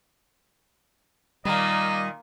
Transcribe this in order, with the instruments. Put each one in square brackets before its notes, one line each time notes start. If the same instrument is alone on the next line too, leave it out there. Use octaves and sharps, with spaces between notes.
[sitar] A#2 D#3 [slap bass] G3 [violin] A#3 [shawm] D#5